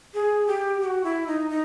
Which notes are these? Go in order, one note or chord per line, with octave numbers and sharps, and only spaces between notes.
G#4
G4
G4
F#4
E4
D#4
D#4